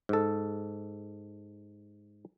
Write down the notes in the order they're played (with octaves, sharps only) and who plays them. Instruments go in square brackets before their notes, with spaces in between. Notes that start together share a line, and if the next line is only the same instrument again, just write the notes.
[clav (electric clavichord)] G#2 A4